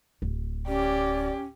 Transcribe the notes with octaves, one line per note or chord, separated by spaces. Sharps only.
D1
C#4 G4 D5